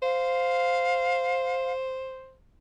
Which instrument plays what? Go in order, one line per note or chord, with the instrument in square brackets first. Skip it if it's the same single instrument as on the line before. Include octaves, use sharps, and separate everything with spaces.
[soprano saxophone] C5 [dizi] F5